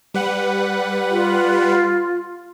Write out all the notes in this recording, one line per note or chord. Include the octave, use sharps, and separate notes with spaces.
G3 B4 F#5
F4